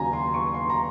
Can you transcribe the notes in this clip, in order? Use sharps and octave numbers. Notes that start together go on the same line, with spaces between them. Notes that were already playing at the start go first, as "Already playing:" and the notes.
Already playing: D#2 C#3 F#3 G#5 A#5
C6
C#6
C6
A#5